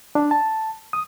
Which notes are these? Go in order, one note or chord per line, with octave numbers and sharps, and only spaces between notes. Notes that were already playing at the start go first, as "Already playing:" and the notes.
D4
A5
D#6